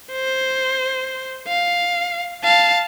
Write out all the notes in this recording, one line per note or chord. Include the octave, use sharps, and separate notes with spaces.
C5
F5
F5 A5